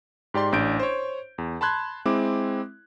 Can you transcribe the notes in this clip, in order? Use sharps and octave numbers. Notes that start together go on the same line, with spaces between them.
G#2 G4 D5 C6
A1 D4 G6 D7
C5 C#5
E2
A5 B5 C6 F#6 G#6
G#3 C4 E4 D6